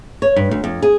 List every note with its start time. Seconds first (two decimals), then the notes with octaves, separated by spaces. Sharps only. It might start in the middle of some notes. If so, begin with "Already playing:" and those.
0.22 C#5
0.36 G2
0.51 D2
0.64 F2
0.82 G#4